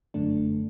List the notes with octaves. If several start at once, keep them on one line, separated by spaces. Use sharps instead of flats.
G1 F#2 D3 A3 D4